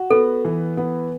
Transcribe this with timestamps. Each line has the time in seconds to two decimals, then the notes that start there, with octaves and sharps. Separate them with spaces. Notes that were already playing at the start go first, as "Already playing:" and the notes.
Already playing: F#4
0.11 B3 A4
0.45 E3
0.77 B3